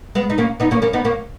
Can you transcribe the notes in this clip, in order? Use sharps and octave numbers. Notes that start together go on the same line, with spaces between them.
G#3 B3
D#4
A#3 C#4
B3 D#4
A#3 C#4
A#3 C#4
B3 D#4
A#3 C#4